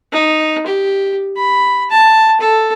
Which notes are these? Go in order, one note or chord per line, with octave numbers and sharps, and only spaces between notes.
D#4
G4
B5
A5
A4